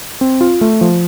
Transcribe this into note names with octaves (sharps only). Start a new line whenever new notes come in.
C4
F4
A3
F3